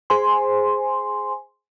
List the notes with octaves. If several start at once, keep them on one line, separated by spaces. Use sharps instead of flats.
G#4 C5 G#5 C6